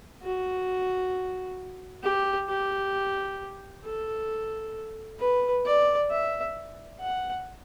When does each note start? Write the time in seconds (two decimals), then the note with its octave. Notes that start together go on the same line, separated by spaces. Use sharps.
0.22 F#4
2.03 G4
2.49 G4
3.85 A4
5.19 B4
5.65 D5
6.10 E5
7.00 F#5